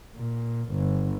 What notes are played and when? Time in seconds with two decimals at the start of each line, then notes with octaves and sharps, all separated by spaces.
0.16 A#2
0.72 G1